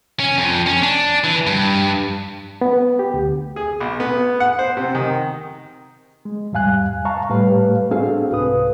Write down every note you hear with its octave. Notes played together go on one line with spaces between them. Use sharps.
C#4
F2
C#4
D4
E3
G2
B3
G4
D2
G#4
B1
B3
F#5
C5
C3
D#3
G#3
E2 G#2 G3 F5 G#5 F#6
F5 A5 A#5 C#6
A2 G3 A3 G4 B4 F5
C4 D4 F#4 G#4 A4 F5
C2 G#2 B4 D#6